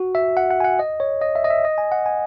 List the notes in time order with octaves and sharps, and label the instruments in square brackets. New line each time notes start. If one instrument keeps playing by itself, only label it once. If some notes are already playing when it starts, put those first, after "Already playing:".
Already playing: [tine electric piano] F#4
E5
F#5
F#5
G#5
F#5
D#5
C#5
D#5
E5
D#5
E5
D#5
G#5
F#5
G#5